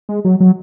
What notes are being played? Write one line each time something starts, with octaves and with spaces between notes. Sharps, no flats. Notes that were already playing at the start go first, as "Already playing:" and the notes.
G#3
F#3
F#3